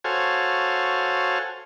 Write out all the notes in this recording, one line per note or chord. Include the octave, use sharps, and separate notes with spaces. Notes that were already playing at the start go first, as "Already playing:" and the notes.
F#4 A4 C5 C#5 F5 G#5